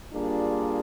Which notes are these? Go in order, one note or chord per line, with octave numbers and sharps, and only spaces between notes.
G3 A#3 D4 F4 G#4